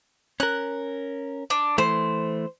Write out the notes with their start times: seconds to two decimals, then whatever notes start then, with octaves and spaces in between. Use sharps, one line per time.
0.40 C#4 A#4 F#6
1.50 D4
1.78 E3 A3 C5